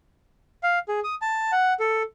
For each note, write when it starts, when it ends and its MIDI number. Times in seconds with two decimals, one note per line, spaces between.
0.63 0.79 77
0.88 1.00 68
1.04 1.15 87
1.22 1.51 81
1.52 1.74 78
1.80 2.02 69